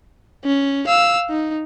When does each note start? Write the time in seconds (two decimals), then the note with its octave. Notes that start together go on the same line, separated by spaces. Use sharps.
0.45 C#4
0.87 F5 E6
1.30 D#4